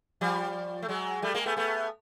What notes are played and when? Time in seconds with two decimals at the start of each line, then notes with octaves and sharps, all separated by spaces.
0.21 F3 G3
0.83 A3
0.88 F#3 G#3
1.22 G3 A3
1.34 G#3 A#3
1.46 A3 B3
1.57 A3 B3